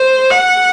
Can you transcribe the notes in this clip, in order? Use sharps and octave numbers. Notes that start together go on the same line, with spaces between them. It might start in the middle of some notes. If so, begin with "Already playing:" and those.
Already playing: C5
F#5